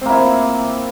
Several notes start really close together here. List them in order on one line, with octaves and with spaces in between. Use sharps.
C4 A#3 E4